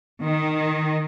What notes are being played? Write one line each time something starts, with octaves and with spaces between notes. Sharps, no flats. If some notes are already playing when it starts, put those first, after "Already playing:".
D#3